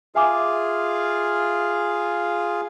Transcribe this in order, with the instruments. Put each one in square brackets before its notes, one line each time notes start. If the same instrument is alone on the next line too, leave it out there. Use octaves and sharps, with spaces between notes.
[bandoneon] F4 G#4 F5 [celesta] E5 G#5 D6